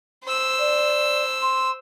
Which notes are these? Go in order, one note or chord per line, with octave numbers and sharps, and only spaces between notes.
C5 E6
D5
C6